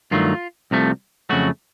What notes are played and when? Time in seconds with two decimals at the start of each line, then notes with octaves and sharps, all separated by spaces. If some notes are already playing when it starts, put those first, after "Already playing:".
0.11 G2 D#3 F#3 A3 F4
0.71 C2 C3 F3 A3
1.29 F2 C#3 F#3 A3 F#4